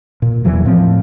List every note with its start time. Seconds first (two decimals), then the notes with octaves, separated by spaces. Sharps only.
0.22 A#2
0.45 E2 A#2 E3 F#3
0.65 A2 F3 C4